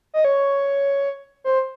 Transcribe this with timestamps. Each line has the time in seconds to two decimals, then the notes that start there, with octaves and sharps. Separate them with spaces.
0.14 D#5
0.25 C#5
1.44 C5